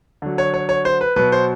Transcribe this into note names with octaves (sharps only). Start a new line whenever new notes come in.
D3 F#3
C#5
C#5
C#5
C5
B4
B2 F#3 B4
C5